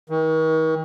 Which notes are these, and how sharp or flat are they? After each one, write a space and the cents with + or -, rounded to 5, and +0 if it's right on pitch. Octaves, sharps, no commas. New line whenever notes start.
D#3 +40